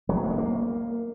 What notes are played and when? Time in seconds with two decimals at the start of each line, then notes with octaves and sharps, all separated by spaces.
0.09 F#3
0.16 B3
0.24 A#3
0.31 G#3
0.38 A#3